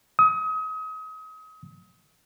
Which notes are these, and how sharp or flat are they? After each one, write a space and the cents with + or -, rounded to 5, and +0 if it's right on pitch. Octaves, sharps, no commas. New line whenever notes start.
D#6 +35